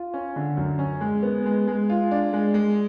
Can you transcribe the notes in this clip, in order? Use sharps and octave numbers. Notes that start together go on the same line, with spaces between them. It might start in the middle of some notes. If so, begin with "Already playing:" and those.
Already playing: F4
C#4
D3
F#2
C#4
G#3
B3
G#3
G#3
F4
D4
G#3
G#3